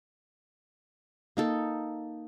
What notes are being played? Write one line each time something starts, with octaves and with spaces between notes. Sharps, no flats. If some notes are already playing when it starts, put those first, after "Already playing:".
A#3 D#4 A4